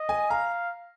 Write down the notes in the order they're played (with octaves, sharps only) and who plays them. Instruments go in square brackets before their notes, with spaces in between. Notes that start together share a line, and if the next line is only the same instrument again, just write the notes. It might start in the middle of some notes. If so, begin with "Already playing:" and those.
Already playing: [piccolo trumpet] D#5
[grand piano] G#5
[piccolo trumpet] F5 [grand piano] A#5